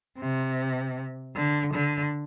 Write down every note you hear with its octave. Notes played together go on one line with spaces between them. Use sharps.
C3
D3
D3